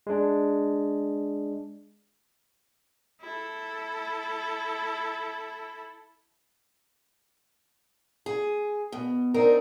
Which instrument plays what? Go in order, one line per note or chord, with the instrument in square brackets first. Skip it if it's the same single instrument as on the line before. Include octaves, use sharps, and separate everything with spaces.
[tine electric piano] G#3 D4
[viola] E4 A4
[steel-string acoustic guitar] G#4
B2
C4 D4 D#4 A#4